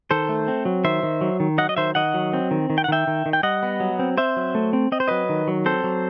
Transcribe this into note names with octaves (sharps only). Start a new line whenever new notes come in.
D#3 A4 C5
A3
C4
F#3
D#3 C5 E5
D#3
F#3
D#3
F#3 D#5 F#5
D#5
D#3 C5 E5
D#3 D#5 F#5
F#3
C4
D#3
D#3
G5
F#5
D#3 E5 G5
D#3
D#3
G5
G3 D#5 F#5
B3
F#3
C4
C4 C5 E5
F#3
A3
C4
C4 D#5
C5
F#3 B4 D#5
D#3
F#3
C4 A4 C5
F#3